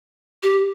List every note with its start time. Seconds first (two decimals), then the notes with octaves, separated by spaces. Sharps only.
0.43 G4